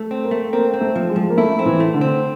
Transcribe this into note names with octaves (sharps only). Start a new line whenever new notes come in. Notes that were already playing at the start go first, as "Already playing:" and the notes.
Already playing: A3
C4
A#3
A3
A#3 C4
C4
A3
F3
G#3
F3
A#3
A3 E4
C4
E3
A3
D3
C4